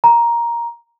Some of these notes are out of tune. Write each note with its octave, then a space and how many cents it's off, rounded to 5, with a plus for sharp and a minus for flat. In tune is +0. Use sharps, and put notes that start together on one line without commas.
A#5 +10